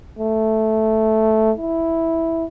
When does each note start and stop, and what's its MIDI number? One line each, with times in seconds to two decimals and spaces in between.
0.19 1.52 57
1.57 2.45 64